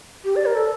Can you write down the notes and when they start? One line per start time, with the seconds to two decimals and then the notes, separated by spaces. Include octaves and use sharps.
0.25 G4
0.36 D5
0.46 A#4
0.55 A4